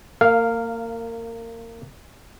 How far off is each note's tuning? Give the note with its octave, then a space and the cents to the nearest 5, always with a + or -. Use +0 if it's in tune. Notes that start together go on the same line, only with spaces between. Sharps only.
A#3 -25 F5 +0